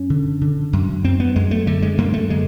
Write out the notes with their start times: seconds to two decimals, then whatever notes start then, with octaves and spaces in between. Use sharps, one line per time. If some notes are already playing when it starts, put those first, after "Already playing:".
Already playing: F#2 C#4
0.10 D3
0.41 D3
0.73 F#2
1.04 F#2 C4
1.20 B3
1.36 F#2 G#3
1.51 A3
1.67 D3 A3
1.82 G#3
1.98 F#2 A#3
2.14 A3
2.30 D3 G#3